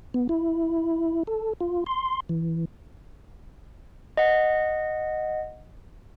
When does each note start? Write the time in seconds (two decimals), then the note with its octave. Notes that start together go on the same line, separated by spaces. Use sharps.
0.14 B3
0.29 E4
1.27 A4
1.61 F4
1.86 C6
2.29 E3
4.17 D#5 F#5